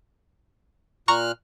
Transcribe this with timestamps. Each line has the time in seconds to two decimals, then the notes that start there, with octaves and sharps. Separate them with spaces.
1.08 A#2 A#5 C#6 F6 F#6